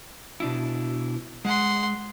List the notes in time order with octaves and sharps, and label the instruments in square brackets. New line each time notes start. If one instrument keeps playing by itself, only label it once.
[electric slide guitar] B2 D4 E4
[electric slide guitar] G#3 [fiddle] F#5 C6